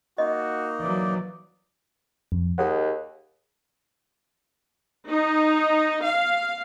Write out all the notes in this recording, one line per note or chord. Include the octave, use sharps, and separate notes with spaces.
A#3 D#4 F#4 D#5
E3 F#3 D5
F2
D#2 G#4 D#5 F#5
D#4
F5